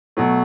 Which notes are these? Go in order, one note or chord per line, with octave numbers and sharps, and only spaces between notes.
B2 F#3 A3